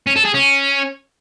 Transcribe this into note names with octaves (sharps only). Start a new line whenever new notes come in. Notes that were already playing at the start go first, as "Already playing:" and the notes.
C#4
A4
G#4
C#4